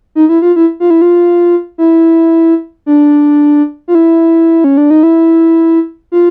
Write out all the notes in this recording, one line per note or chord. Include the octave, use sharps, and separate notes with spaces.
D#4
E4
F4
E4
F4
E4
F4
E4
D4
F4
E4
C#4
D4
D#4
E4
F4